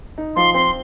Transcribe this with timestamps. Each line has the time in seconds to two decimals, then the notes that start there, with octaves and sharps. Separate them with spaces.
0.18 D#4
0.36 F3 C6
0.54 C4 C6